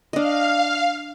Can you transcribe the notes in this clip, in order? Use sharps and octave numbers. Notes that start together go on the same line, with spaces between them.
D4 D#5 F5